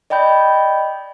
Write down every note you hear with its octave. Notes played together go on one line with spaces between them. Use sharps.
D5 D#5 G5 B5 G6